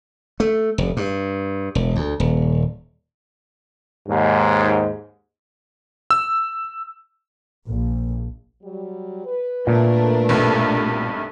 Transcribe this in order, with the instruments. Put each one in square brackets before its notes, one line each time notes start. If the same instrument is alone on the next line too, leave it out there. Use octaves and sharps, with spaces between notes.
[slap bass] A3
F1
G2
E1
D2
D#1
[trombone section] D#2 G#2
[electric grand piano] E6
[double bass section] A#1
[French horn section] F#3 G3
B4
[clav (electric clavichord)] A#2 [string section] A3 D4 A#4
[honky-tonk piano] B1 G2 C3